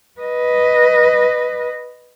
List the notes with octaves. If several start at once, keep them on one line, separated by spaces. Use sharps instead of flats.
B4 D#5